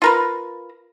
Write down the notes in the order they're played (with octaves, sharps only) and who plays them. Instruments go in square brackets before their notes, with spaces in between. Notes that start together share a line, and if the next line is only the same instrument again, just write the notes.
[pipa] F4 A#4 B4